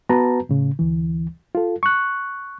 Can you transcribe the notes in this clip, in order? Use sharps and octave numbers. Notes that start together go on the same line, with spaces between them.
B3 F#4 B4 A5 A#5
A2 C#3
D2 E3
F4 A4
C#6 F#6